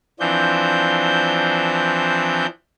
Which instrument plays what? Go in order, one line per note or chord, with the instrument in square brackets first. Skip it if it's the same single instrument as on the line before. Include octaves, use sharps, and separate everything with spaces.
[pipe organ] E3 F3 C4 D4 G6